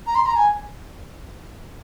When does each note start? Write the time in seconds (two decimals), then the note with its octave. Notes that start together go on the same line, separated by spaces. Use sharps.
0.07 A#5
0.15 C6
0.26 A#5
0.36 G#5